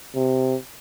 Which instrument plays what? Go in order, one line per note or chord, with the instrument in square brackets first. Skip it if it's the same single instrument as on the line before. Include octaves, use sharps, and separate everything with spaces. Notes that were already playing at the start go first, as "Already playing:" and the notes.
[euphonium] C3